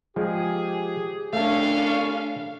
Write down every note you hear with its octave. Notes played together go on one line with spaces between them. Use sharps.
F3 G#3 G4 G#4
G1 C2 A3 C#4 D4 A4 F5